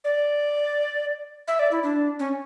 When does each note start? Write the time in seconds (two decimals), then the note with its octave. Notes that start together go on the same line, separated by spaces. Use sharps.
0.04 D5
1.48 E5
1.59 D5
1.71 E4
1.83 D4
2.19 C#4